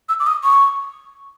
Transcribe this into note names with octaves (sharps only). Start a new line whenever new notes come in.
E6
D6
D#6
C#6